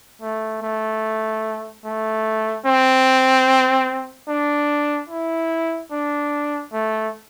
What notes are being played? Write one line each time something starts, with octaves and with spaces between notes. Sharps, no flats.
A3
A3
A3
C4
D4
E4
D4
A3